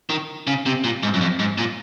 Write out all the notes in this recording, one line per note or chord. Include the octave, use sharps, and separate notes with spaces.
D#3
C#3
C3
A#2
G#2
F#2
F2
G#2
A#2